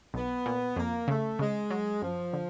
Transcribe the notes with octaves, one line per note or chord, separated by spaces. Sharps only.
B1 B3
A#2
F2 A#3
C#3 A3
C#3 G#3
F#3
F#2 F3
D3